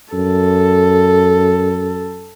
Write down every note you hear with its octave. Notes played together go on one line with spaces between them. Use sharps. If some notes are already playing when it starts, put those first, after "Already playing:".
F#2 A4